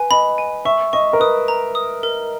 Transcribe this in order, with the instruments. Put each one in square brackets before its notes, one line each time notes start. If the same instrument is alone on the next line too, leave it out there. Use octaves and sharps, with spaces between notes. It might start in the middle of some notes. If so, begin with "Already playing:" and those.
Already playing: [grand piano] B4 [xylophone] G#5
[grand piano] D#5 [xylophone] B5
[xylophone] G#5
[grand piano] E5 [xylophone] C#6
[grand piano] D#5 [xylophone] C#6
[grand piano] A#4
[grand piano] B4 [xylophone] D#6
[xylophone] A#5
D#6
A#4